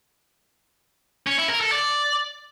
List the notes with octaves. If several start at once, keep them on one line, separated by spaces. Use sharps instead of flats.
C#4
E4
A#4
A4
D5